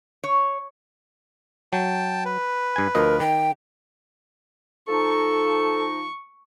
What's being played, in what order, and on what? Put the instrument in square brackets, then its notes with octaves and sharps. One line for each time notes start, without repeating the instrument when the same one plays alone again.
[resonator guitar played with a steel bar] C#5
[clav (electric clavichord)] F#3 [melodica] G5 A5
[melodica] B4
[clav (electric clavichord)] G2 G#5
[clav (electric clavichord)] D2 F3 D#5 [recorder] A#4
[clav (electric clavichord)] D#3 [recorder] G5
[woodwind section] F3 D#4 [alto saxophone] A4 [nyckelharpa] C#6